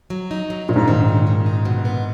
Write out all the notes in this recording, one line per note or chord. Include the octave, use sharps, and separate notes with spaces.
F#3
D#4
F#3
F2 A#2
G#2
G#2 D#3
C#4
D#3
D#4
B2
B3